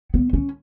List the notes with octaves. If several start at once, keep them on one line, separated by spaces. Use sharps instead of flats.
B3
C#4